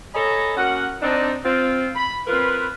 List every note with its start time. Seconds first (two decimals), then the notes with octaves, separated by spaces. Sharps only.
0.15 A4 C#5 D#5 G#5 A#5 B5
0.57 A#3 C#4 F#4 F#5
1.02 C4 D4 D#4
1.45 C4 F4
1.96 B5
2.27 C4 F4 A#4 B4